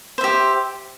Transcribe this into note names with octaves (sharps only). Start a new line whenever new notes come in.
G4 C5 E5